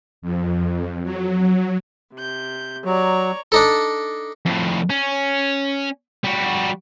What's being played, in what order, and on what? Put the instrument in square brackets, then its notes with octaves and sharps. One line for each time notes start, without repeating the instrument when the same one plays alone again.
[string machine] F2
F#3
[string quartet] C3 G6
[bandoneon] F#3 [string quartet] C#5 D5 A#5
[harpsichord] D4 D#4 A4
[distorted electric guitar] F2 A2
C#4
G3 F#4